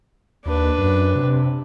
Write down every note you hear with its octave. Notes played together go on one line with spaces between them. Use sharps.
D#2 D4 B4
F#2
C3